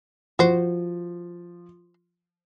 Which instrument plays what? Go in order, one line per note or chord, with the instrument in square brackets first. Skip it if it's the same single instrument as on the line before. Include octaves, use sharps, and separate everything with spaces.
[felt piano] F3 [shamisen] F#4 C5